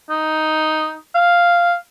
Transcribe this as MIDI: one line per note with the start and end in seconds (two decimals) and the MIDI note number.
0.10 0.96 63
1.15 1.75 77